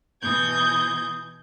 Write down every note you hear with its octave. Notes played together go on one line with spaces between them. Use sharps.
B2 E3 D#6 G6 G#6